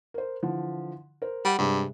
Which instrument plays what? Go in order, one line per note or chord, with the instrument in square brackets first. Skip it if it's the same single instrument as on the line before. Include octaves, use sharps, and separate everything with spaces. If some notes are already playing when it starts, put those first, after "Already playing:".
[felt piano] A#4 C5
D3 E3 F3
A#4 C5
[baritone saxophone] G3 [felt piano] F#5
[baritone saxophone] G2 [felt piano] C3 G#3